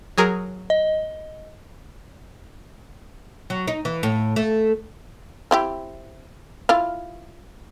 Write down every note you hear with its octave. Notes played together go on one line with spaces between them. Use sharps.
F#3 G#4 A#4
D#5
F#3
D#4
E3
A2
A3
C4 E4 G4
E4 F4 F5